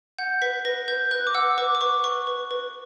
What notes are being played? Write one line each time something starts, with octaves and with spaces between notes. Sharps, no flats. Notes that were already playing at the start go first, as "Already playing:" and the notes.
F#5 G6
B4 B6
B4 A#6
B4 G6
B4 F#6
D6
F#5 E6
B4 D6
D6
B4 C#6
B4 C#6
B4
B4